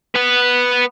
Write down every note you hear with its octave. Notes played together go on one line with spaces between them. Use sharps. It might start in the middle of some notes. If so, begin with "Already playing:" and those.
B3 B4